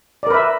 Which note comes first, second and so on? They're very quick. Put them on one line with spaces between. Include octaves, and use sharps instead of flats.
D5 A#4 B4 E5